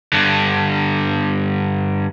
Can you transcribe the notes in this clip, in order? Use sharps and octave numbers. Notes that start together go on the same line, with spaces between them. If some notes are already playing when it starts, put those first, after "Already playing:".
G2 D3